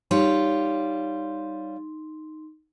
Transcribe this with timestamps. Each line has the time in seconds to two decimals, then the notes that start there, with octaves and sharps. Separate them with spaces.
0.11 G3 D#4 F4 C#5 C6